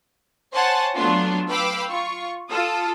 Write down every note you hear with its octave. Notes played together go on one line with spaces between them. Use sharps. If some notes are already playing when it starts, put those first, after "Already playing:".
C5 C#5 F#5 G#5 A5
F#3 A3 B3 D4 F4
B4 F5 G5 B5 D6 E6
F4 C#6
F4 A4 D#6